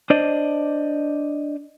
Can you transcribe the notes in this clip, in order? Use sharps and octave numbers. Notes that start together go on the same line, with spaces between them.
D4 C5 D5 D#5